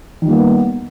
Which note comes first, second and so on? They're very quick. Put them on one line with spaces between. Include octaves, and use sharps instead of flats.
D#3 G3 A#3 B3